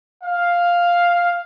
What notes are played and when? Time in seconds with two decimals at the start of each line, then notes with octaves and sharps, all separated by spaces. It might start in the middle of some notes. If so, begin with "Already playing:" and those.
0.24 F5